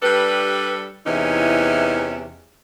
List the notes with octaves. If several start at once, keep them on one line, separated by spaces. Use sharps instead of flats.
G3 D4 G4 A4 B4
E2 C3 E3 C#4 D#4 E4